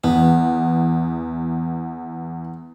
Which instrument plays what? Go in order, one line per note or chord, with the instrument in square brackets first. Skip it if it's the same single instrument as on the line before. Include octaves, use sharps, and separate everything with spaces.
[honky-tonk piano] E2 [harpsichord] B3